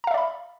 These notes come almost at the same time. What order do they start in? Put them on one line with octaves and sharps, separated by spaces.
A#5 F5 E5 D5 B5